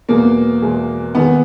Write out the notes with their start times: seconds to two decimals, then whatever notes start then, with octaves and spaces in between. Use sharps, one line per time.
0.09 E2 B2 G#3 A#3
0.62 E2 B2 G#3
1.15 D#2 D#3 G#3 B3 D#4 G#4